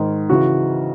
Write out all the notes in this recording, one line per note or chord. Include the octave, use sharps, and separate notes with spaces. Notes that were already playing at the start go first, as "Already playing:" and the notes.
Already playing: G#2 D#3
C#3 E3 F#4